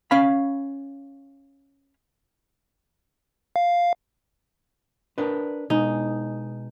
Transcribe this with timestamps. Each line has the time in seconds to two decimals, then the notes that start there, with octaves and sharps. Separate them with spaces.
0.11 C#4 F5 B5
3.56 F5
5.18 D4 A#4 B4
5.70 B2 G#3 D#4